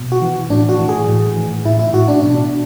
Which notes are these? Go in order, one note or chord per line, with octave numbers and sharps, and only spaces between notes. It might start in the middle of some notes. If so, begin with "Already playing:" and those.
Already playing: B2
F#4
E3
A2 D4
F#4
E3
G#4
A2
E3
A2 E4
E4
A2 F#4
D4
B2 D4